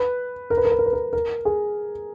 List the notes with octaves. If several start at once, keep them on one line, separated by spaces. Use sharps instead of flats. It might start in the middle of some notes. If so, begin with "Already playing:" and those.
Already playing: B4
A#4
B4
A#4
B4
A#4
B4
A#4
A#4
G#4